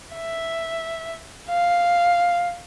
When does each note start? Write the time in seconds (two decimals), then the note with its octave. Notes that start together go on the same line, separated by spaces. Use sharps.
0.15 E5
1.49 F5